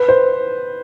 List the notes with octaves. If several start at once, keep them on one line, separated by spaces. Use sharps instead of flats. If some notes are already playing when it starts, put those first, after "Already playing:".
Already playing: B4
C5